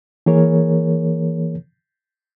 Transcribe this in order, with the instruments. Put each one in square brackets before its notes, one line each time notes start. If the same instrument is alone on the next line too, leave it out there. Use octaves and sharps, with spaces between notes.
[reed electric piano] E3 A#3 G#4 A#4 C#5